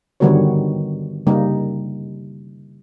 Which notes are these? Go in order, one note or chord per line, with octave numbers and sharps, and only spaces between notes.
D3 D#3 G3 B3 F#4 C#5
C#3 G3 A#3 D#4